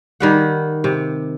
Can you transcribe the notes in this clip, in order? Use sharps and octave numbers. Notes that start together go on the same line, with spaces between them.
D#3 G3 F#5
C3